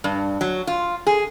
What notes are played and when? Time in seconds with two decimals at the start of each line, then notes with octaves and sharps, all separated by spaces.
0.04 G2
0.41 F#3
0.67 F4
1.07 G#4